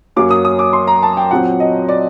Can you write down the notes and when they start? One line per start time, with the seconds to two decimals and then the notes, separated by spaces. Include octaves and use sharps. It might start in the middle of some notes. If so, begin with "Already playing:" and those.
0.16 F#2 F#3 A#3 D6
0.31 D#6
0.45 D#6
0.59 D6
0.73 C6
0.87 A#5
1.03 A5
1.17 G5
1.31 A#2 F#3 C4 F#5
1.60 D#5
1.89 D5